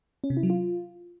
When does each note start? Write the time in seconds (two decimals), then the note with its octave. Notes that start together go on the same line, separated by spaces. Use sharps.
0.24 C#4
0.30 C3
0.37 E4
0.43 F#3
0.50 F4